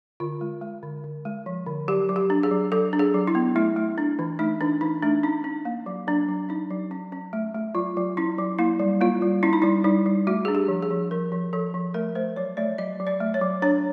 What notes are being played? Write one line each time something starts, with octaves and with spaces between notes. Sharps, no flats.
D3 F4
G#3
G#3
D3
D3
G#3
F3
D3
F#3 G4
F#3
G4
D4
G#4
F#3
F#3 A4
D4
G#4
F#3
E4
B3
A3 E4
A3
D4
E3
A3 D#4
E3 D4
E3 D#4
A3 D4
C#4 D#4
C#4
A#3
F#3
F#3 D4
F#3
C#4 D#4
F#3
C#4
C#4
A3
A3
F#3 F4
F#3
C#4 E4
F#3
A#3 E4
G3
A#3 F4
G3
C#4 E4
D#4
G3 E4
G3 D#4
G3
A3 F#4
D4 G#4
G4
F3
G#4
F3
F3 A#4
F3
F3 A4
F3
A3 A#4
A3 C5
F#3 C#5
A3 D5
F#3 D#5
F#3
D5
A3
C#5
F#3
D4 C#5